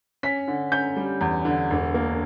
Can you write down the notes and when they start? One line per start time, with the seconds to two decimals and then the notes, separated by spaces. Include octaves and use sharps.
0.23 C#4 B6
0.48 D3
0.72 C#4 G6
0.96 G3
1.21 E2
1.45 D3
1.70 E1
1.94 A#3